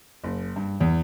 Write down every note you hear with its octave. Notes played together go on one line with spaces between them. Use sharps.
F#1
G2
E2